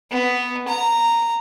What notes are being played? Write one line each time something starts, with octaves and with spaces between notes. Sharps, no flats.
B3
A#5